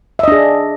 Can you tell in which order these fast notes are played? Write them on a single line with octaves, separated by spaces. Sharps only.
E5 D#5 D4 G#4